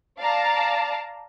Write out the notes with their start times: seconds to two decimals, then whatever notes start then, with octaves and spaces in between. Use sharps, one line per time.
0.18 D5 F5 A5 A#5